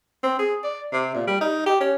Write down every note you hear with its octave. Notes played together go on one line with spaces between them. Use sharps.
C4
G#4
D5
C3
A#2
G3
D#4
G4
C#4